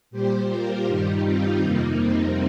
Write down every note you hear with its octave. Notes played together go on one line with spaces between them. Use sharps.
A#2 G3 G4 C5
F4 A#4
G2 D#3 G3 D#4 G4
C4 F4
F2 C3 G3 A#3 D#4
C4